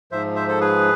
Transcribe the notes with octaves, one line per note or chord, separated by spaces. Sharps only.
G#2 F3 C5 E5
C5 E5
A4 C5
G#4 B4